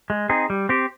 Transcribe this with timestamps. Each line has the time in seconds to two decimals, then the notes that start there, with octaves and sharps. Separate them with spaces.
0.10 G#3
0.29 C4 D#4 G#4
0.50 G3
0.69 C4 G4